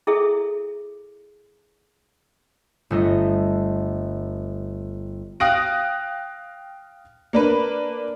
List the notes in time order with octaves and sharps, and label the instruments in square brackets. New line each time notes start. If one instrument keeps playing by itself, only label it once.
[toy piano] E4 G#4 A4 E5
[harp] G1 A3 D#5
[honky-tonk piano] F5 G5 D#6 F#6 A#6 D7
A#3 D4 B4